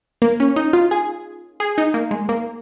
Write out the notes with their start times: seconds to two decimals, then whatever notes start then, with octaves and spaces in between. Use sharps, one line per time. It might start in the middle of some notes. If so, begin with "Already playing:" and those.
0.22 A#3
0.40 C#4
0.56 D#4
0.73 F4
0.91 G#4
1.60 G#4
1.78 D#4
1.94 A#3
2.11 G#3
2.29 A#3